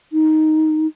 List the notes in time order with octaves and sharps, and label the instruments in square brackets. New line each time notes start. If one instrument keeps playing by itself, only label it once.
[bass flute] D#4